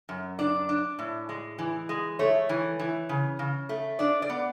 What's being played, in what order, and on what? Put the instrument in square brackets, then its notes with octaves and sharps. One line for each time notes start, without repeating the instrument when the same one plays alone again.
[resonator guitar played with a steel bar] F#2
D4 D5
D4
A2
G#3
E3
G#3
A3 C#5
E3
E3
C#3
C#3
A3
D4 D5
D5
B3